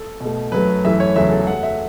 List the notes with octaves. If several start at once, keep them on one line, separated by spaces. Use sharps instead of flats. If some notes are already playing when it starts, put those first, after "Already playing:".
Already playing: A4
B2
A3
F#2 F#3 A3 B4
F#2 E3 A3 E5
C#5
E2 C#3 F#3 A3 E5
A4
F#2 F#3 A3 F#5
E5